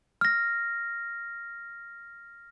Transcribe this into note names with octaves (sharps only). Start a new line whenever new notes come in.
F6 A#6